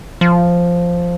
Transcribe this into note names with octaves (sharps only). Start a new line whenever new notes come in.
F3